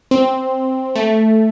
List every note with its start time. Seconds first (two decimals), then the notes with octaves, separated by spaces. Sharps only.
0.11 C4
0.96 A3